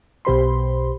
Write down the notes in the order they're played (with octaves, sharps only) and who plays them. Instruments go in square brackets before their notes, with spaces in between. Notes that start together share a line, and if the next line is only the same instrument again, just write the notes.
[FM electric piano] B1 B2 G4 C5 B5 C6